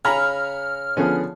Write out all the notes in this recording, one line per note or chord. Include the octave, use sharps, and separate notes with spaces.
C#3 G#5 A#5 B5 F6
D3 F3 B3 C#4 G#4